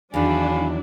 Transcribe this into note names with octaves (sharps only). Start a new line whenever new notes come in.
E2 D#3 F#3 D4 E4 F5 G#5 B5